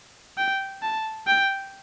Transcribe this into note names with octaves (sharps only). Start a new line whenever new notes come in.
G5
A5
G5